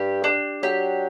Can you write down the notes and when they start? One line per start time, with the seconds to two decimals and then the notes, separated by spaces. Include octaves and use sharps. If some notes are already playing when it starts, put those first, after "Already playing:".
Already playing: G2 G4
0.24 D4
0.63 F#3 G4